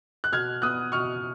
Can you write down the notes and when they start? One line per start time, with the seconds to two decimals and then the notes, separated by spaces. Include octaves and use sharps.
0.24 F#6
0.32 B2 F6 G#6
0.62 B3 D#6 F#6
0.92 B2 C#6 F6